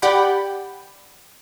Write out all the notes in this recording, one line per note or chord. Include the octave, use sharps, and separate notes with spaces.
G4 D5 F#5 G5 B5